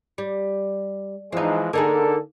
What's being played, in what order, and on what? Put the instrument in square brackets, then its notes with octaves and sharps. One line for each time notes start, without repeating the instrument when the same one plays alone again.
[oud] G3
[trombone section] E3 F3 G#3 [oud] C4 D#4
[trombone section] D3 A4 [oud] A#3 D#4 G#4